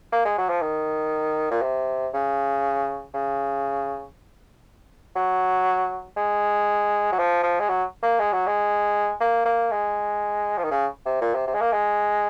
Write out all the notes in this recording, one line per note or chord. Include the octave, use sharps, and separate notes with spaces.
A#3
G#3
F#3
F3
D#3
A#2
C3
C#3
C#3
F#3
G#3
F#3
F3
F3
G#3
F#3
A#3
G#3
F#3
G#3
A#3
A#3
G#3
F3
D#3
C#3
C3
A#2
C3
C3
G#3
A#3
G#3